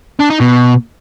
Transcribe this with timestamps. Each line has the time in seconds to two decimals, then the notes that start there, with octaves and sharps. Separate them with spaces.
0.19 D4
0.30 D#4
0.41 B2